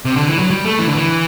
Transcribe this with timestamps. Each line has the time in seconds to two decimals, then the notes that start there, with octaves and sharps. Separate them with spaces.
0.05 C3
0.16 D3
0.28 E3
0.39 F#3
0.51 G3
0.65 A3
0.79 E3
0.88 D3
0.95 E3